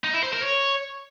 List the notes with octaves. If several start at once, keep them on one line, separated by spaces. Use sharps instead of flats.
D#4
E4
C5
A#4
C#5